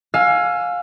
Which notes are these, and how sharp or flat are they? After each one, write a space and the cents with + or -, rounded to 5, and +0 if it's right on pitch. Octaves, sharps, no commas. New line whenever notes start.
F5 +25 G#5 +10 E6 +40